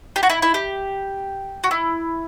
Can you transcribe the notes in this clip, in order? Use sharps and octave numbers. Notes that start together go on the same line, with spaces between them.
G4
F#4
E4
E4
G4
F#4
E4